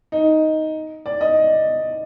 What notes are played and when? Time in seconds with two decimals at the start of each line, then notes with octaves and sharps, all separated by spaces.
0.12 D#4
1.06 D5
1.21 D#5